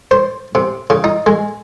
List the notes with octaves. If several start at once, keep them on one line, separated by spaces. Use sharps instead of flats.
C5
C3
C#3
D#4
G#3